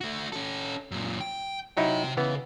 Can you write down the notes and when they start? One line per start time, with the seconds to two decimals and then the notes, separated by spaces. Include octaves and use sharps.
0.01 A3 F#4
0.32 C#4 A4
0.91 F#2 A#2
1.21 G5
1.77 C3 F#3 D#4 E4 G5
2.17 C#3 E3 B3